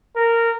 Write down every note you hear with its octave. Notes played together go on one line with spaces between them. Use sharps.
A#4